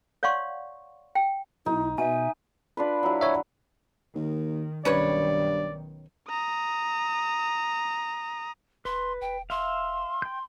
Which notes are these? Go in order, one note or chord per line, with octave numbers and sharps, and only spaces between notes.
C#5 D5 F5 F#5 C6 C#6
G5
B1 D#4 E4
B2 E5 G#5 D#7
D4 F4 B4
F#3 E4
C#5 E5
D#2 D#3
B1 G2 D#3 C#4 B4 C#5 D5
A#5 D#6
D#1 B4 C6
E1 G5
E5 F5 C6
G5 G6